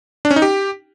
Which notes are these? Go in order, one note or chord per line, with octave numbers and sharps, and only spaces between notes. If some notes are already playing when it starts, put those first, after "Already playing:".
D4
C#4
D#4
G4